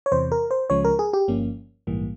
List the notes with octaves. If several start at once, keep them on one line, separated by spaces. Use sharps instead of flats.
C#5
E2 C3 E3 C5
A#4
C5
C#2 C#3 F3 G#3 C#4 C#5
A#4
G#4
G4
G1 G2 F3 A#3 C#4
A#1 G#2 E3 G3 A#3